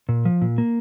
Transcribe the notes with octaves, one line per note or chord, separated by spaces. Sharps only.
A#2
F3
A#2
A#3